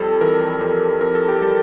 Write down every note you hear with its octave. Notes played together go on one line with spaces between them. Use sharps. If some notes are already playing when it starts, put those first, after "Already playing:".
Already playing: F2 G3 A4
E3 A#4
F2
F2 A#4
A4
G4
G3 A4